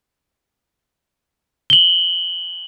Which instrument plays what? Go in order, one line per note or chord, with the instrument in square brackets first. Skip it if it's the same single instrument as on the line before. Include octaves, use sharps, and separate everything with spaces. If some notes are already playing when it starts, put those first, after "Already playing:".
[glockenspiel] F#7 G7